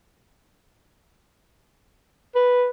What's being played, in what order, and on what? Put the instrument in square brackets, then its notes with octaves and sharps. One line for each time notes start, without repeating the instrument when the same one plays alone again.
[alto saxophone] B4